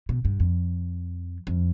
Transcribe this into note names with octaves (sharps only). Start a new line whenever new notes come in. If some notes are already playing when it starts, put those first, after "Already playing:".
B2
G2
F2
F2